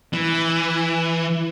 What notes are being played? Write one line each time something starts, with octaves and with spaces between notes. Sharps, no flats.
E3